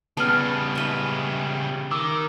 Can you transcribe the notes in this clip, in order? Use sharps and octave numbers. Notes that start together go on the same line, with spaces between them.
C#3 G3 B3 G#4 A5 F6
B4 D#5 E5
D#3 D6 E6